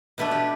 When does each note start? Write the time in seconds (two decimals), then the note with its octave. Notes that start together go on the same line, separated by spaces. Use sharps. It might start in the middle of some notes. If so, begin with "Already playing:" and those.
0.18 B2 A3 D4 B4
0.31 G4